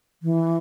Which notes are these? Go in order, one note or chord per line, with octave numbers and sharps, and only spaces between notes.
E3